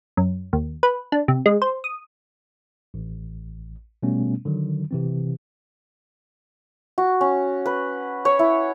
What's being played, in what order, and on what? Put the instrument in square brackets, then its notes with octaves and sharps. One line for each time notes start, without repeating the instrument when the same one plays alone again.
[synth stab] F#2
D#2
B4
D4
C3
G#3
C5
D#6
[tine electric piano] A1
B2 G3 A3 B3 C#4
D3 D#3 F#3
C3 E3 C4
[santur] F#4
C#4
B4
C#5
E4